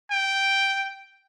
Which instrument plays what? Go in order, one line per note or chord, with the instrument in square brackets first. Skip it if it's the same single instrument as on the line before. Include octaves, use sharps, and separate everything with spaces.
[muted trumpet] G5